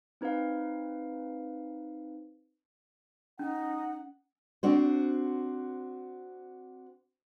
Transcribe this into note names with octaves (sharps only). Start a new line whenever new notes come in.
C4 D#4 B4 C5 F5
C#4 D#4 F#5
C4 D4 F#4 C5